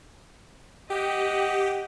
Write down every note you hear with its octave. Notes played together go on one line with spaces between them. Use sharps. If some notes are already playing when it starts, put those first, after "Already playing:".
G4 D#5 F#5